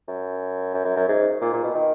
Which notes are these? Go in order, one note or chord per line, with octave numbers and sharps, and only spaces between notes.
F#2
F#2
F#2
F#2
G#2
A#2
A#2
B2
D#3